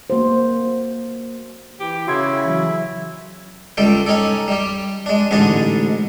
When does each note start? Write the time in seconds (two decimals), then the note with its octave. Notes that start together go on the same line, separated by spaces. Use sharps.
0.10 A#3 F#4 C5
1.80 E3 G4
2.07 C#3 E4 F#4 C6 G#6
2.45 E3 F#3
3.77 C#2 G3 A4 G5
4.06 C#4 D#4 G4 A4
4.48 G3 G4
5.06 G#3 D4
5.31 A1 G#2 D3 D4 D#5 A5